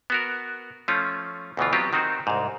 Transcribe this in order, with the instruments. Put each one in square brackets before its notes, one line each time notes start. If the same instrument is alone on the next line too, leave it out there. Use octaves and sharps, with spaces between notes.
[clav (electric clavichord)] B3 F#4 A#4
F3 A3 C#4 F4
D2 B2 E3 F4
F#3 B3 C4 F4 G4
D#3 C4 D#4 F#4 C5
C2 G#2